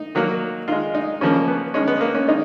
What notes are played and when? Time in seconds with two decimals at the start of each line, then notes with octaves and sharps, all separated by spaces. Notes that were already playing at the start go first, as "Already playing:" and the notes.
Already playing: D#4
0.15 D#3 F#3 A#3
0.68 D#3 G#3 F4
0.95 D#4
1.21 C#3 F3 A#3 C#4
1.48 B3
1.74 D#3 G#3 C#4
1.88 B3
2.01 A#3
2.15 C#4
2.28 D#3 G#3 D#4